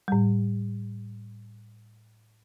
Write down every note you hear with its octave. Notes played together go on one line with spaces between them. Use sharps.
A2 G3